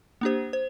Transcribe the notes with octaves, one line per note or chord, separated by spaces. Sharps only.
A#3 D4 G4 C5
C5